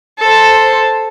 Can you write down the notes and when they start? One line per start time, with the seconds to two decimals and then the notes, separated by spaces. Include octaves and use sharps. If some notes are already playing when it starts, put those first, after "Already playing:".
0.19 A4 C5